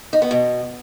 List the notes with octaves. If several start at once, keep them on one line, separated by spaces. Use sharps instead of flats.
D#4
B3
B2